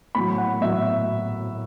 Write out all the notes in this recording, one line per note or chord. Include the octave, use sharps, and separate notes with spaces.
A2 F#3 B5
F#5
A2 F#3 E5